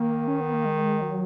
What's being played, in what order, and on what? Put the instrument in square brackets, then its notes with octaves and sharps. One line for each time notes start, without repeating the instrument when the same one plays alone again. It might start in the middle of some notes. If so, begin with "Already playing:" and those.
Already playing: [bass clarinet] D#3 [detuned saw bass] A#3
[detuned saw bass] C#4
B3
A#3
G#3
F#3